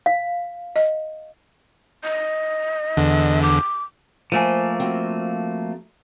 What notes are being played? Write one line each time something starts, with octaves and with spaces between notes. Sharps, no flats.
F5
D#5
D#5
E2 D3
D6
F3 A3 A#3 C5 G#5
C4 F#4